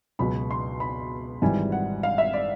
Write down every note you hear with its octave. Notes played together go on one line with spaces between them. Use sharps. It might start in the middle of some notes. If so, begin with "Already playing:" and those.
C#2 B2 F#3 B5
C6
B5
G#1 G#2 E3 G3 G#5
F#5
F5
E5
D5